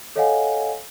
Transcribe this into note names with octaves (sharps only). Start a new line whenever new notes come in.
A4 C#5 D#5 F5 F#5 G#5